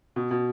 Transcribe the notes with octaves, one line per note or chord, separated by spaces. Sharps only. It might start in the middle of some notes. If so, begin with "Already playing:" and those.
B2
B2